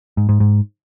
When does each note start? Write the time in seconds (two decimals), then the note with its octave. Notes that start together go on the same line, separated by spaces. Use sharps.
0.17 G#2
0.29 G#2
0.40 G#2